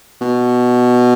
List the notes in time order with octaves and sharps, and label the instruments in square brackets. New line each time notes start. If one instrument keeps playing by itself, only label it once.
[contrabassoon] B2